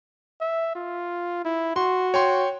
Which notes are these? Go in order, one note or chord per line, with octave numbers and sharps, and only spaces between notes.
E5
F4
E4
F#4 C6
C#5 G5 C6